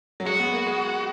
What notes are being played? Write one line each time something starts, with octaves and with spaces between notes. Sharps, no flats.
F#3
G#3 F#4
B3
A#3
G#3